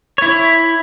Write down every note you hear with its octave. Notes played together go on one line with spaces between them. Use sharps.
E4 C#5